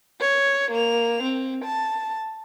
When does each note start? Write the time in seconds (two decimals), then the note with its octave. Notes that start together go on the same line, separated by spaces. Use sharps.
0.20 C#5
0.71 A#3 F7
1.23 C4
1.64 A5